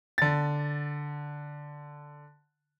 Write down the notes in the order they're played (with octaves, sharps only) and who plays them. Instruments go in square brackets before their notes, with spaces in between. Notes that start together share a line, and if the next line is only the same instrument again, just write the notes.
[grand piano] D3 A6